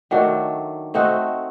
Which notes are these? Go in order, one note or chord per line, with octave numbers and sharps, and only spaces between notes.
D#3 F#3 A3 D4
A3 C4 D#4 F#4